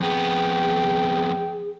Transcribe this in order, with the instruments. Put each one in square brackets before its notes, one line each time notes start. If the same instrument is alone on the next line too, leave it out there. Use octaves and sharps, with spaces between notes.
[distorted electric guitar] F2 B3 [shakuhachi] G#4 [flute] G5